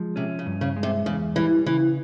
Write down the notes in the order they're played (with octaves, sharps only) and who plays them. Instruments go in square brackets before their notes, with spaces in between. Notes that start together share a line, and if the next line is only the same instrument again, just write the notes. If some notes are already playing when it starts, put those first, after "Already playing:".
Already playing: [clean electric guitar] F3 G#3
[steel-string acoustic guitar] C3 [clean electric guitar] C#4
[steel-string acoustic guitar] C#3
[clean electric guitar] G2
[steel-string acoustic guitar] C#3
[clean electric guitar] G#3
[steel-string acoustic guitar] C3
[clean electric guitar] E2 [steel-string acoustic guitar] C#3
[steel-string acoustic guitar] E3 [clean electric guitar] G3
[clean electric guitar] C#3 [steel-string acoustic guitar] E3